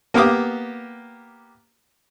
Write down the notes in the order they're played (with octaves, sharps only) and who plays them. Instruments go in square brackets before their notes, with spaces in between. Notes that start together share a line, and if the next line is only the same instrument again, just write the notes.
[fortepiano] A#3 B3 G4 D6 D#6